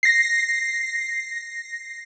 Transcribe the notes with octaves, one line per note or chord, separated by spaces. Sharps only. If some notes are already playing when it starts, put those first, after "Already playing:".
A#6 C7